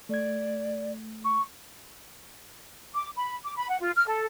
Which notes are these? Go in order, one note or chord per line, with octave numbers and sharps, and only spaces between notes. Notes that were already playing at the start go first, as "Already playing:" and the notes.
A3 D5 G#6
C#6
D6
B5
D6
B5
F#5
F4
F6
A4